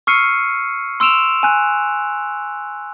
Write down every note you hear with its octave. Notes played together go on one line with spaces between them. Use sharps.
C#6 E6 F6 C7 C#7 D#7
C6 E6 D7 E7 F7
G#5 F#6